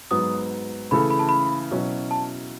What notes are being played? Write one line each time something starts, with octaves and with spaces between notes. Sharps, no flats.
G#2 F#3 B3 D#6
C#3 E3 A3 E4 A4 B5
B5
A5
B5
B2 F#3 C#4 E4
A5